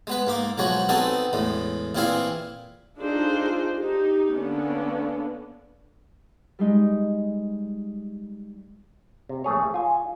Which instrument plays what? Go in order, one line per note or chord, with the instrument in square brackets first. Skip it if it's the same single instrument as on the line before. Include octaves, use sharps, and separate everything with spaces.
[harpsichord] G#3 B3 B4
G#2 A#3 D6
B1 F3 G#3 F#4 C#5
B3 C4 D#4 F#4 G#4 A4
E2 A2 G#3
A#2 E3 C4 E4 G#4 F5
[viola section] D4 D#4 F4 G#4 A4 C5
D#4 G4
D3 A#3 B3 C#4 D4
[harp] G3 G#3 D#4
[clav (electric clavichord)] C3
A#1 A3 G#4 C#5
F4 G#5